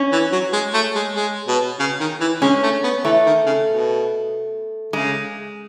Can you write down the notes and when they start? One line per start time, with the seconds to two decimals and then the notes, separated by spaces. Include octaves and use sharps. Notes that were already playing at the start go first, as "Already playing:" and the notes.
Already playing: C#4
0.12 E3
0.32 F#3
0.53 G#3
0.74 A3
0.95 G#3
1.16 G#3
1.48 B2
1.79 C#3
2.00 D#3
2.21 E3
2.42 G#3 C#4
2.63 A3
2.83 B3
3.04 E3 A3
3.26 D#3
3.46 C#3
3.67 B2
4.93 C#3 G#3